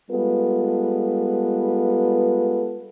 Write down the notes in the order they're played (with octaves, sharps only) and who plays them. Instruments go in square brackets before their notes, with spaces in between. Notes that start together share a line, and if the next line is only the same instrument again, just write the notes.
[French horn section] G3 G#3 B3 F4 A4 B4